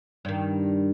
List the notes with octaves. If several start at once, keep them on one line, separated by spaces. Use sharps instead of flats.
G2 D#3